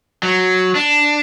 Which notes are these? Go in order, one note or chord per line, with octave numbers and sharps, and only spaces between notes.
F#3
D4